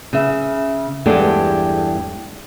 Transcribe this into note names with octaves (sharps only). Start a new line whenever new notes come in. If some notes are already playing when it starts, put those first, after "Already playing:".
C#3 E5
E2 G2 G#3 D4 G4 A4